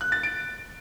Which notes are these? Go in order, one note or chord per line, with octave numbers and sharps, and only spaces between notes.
F#6
A6
D7